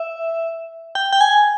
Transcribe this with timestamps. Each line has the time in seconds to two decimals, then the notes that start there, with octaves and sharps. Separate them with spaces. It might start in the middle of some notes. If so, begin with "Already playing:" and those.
Already playing: E5
0.95 G5
1.13 G5
1.21 G#5